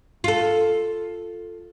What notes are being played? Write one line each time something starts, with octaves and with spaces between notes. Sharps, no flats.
F4 A4